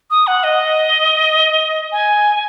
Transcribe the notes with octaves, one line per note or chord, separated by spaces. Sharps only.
D#6
F#5
D#5
G#5